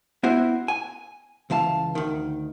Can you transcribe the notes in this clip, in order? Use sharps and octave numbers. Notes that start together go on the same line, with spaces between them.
B3 E4 F#4 C5
G#5
C#2 E3 F5 A5
D2 D#3